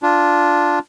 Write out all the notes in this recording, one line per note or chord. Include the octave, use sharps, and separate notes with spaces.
D4 F4